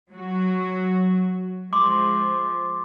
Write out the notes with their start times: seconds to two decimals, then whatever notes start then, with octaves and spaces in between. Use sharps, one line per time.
0.12 F#3 F#4
1.73 F3 G#3 C6 D6